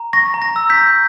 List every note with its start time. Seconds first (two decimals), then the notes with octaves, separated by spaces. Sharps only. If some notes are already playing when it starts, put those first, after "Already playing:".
Already playing: A#5
0.13 C#6 A#6
0.34 A#5
0.42 A#6
0.56 E6
0.70 G6 B6
0.77 A#5